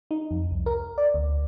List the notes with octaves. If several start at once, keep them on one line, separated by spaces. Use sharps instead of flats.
D#4
F2
C2
A#4
D5
D2